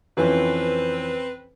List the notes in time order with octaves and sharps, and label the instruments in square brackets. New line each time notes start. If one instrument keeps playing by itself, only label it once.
[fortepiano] F2 E3 C#4 [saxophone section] C4 B4